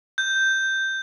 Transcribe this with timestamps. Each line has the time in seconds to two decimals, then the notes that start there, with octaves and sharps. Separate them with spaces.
0.18 G6